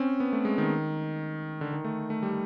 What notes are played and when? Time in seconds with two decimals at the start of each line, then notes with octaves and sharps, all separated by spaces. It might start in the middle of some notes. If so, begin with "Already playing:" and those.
Already playing: C4 C#4
0.20 B3
0.33 A3
0.45 G#3
0.58 D#3
1.61 D3
1.73 D#3
1.84 A3
2.10 A3
2.23 G3